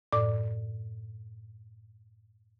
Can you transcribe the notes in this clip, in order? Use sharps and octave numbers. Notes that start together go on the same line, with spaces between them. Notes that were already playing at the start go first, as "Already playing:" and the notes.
F#2 A2 D5 D6